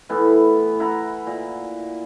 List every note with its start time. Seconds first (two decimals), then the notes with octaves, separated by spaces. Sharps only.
0.09 A2 E3 B3 E4
0.80 E4 F#5 A#5
1.27 A#2